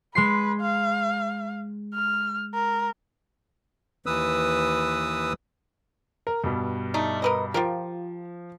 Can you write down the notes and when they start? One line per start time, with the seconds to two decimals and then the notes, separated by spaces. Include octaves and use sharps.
0.15 G#3 B4 C6 C7
0.61 F5
1.94 F6
2.54 A#4
4.06 D#2 E3 B4 D#6 E6
6.27 A#4
6.44 G2 B2
6.94 A3 D4 D#4
7.22 A#4 B4 D#5
7.54 F3 F4 G4 A#4